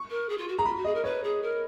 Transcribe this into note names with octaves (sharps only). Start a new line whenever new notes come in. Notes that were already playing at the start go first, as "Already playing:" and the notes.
Already playing: C#6
A#4
G#4
F4
F#4
G#4 A#5
F4 B5
F#4
G#4 D#5
A#4
B4 C#5
G#4
A#4